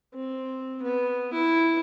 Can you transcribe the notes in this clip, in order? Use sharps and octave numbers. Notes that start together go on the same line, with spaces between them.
C4
B3
E4